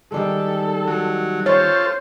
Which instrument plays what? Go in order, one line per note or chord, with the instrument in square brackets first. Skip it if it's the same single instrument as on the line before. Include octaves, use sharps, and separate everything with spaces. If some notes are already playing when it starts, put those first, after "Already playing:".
[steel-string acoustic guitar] D#3 G3 G#3 [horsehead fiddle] A4
[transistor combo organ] F#3
[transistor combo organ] F4 A4 [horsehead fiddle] C5 [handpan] C#5